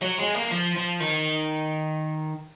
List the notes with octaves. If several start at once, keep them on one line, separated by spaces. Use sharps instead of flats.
F#3
G#3
A#3
F3
F3
D#3